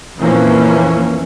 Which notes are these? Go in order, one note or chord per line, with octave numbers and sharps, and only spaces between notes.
F2 A#2 E3 F3 A#3 C#4